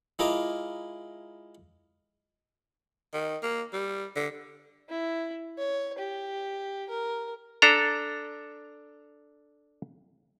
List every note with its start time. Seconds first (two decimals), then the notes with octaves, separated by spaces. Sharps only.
0.19 G#3 E4 F4 A#4 D#5 D6
3.14 D#3
3.43 A#3
3.73 G3
4.16 D3
4.89 E4
5.58 C#5
5.98 G4
6.89 A#4
7.62 D4 A4 A#5